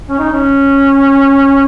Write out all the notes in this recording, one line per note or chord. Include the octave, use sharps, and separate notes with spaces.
C#4
D#4
C#4